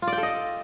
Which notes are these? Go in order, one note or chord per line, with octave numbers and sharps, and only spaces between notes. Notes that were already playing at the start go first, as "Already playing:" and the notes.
F4
D5
G5
A4
D#5